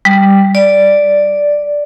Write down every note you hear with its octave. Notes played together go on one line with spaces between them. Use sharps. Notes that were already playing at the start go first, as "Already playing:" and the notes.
G3
D5